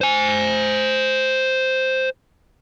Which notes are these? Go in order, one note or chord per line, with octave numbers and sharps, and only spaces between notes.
C5 G#5